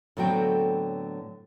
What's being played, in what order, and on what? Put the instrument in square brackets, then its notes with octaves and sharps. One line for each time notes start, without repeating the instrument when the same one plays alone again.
[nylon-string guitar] A2 D3 F#3 B3 C4 G5